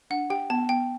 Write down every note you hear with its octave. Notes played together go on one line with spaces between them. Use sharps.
D4 F#5
G4 G5
B3 A5
B3 G5